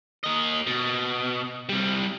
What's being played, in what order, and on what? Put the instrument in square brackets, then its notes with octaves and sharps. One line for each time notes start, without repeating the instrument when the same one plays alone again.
[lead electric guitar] A#3 D#5
B2
C3 G3